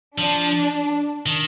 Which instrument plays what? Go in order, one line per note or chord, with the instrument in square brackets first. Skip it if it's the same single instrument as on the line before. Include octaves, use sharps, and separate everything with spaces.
[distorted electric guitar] F3 [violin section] D4
[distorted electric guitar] D#3